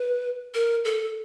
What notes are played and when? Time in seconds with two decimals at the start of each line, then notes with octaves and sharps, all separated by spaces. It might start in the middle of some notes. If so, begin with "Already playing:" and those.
Already playing: B4
0.54 A#4
0.85 A4